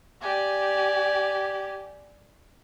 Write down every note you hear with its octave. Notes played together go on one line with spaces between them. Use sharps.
G4 D5 G#5